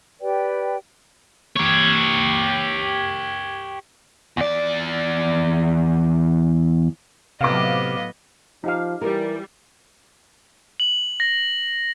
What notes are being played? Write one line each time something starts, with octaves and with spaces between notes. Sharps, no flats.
G4 B4 D5 G5
G4 C#5
E2 D5
A2 C3 F#3 B3 D#5 F5 D6
F3 D#4 G4 F5
E3 G3 A#4
F#7
A#6